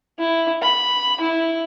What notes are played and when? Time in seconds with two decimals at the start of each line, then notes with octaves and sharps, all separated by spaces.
0.19 E4
0.62 B5
1.20 E4